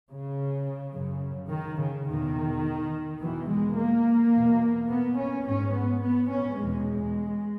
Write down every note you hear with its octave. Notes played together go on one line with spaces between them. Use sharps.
C#3
F#2 C#3
D#3
C#3
E2 B2 D#3
E2 B2 E3
G#3
A#3
E2 B2
B3
C#4
G#2 C#4
B3
B3
C#4
E2 B2 G#3